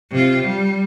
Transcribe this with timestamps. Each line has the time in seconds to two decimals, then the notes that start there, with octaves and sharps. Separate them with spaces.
0.11 C3 F4
0.43 G3